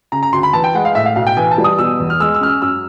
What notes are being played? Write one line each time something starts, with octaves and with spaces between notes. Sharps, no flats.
C#3 A#5
A#5
D2 C6
B5
E3 A5
G5
G#3 F#5
F5
A2 E5
F5
B1 F5
G5
E3 G#5
A5
G3
D#6
B2 E6
E2
F6
G#3 E6
E6
C#4 F6
E6
F#2 E6